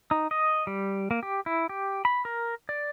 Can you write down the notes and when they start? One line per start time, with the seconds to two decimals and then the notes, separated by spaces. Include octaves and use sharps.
0.11 D#4
0.31 D#5
0.67 G3
1.11 A#3
1.23 G4
1.46 E4
1.69 G4
2.05 B5
2.25 A#4
2.69 D5